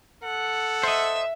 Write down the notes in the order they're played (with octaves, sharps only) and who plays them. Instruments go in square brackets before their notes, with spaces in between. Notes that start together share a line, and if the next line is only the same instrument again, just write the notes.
[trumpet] A4 [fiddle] F#5
[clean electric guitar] C5 D#5 [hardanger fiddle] E5